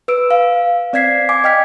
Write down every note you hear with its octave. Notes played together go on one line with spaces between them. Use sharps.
B4 E6 D7
F5
C4 D5 F5 G#6 B6 C7
G#5 D6 G#6
D#5 G5 F6 G#6 B6